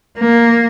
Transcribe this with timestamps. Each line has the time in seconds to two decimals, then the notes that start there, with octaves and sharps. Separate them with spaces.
0.19 A#3